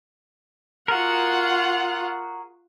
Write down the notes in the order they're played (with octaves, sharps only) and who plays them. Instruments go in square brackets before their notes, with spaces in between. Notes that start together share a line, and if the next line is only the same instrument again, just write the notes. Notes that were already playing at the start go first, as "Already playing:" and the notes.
[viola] F4 F#5 [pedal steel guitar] F#4 G#4 A#4